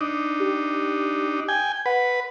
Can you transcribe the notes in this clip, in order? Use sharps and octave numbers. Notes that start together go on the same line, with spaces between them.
D4 D#4
G4
G5 G#5
B4 F#5